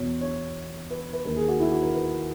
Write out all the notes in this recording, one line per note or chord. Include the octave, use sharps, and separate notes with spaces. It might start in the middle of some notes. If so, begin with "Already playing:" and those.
Already playing: E2 B2 C#5
C#5
B4
B4
D#2 D#3 A#4
G#4
F#4
E4
F#4
A#4
B4